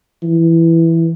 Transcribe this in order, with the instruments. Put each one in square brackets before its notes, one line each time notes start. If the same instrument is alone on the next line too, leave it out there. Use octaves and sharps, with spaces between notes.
[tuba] E3